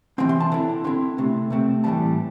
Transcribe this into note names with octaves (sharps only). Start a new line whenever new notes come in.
C3 E3 C4 G5
C6
A5
D3 C4 E4
D3 C4 E4 C6
C3 A3 C4
C3 A3 C4
A2 E3 G3 A5